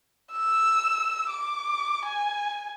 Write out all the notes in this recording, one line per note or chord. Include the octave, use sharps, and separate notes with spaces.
E6
D6
G#5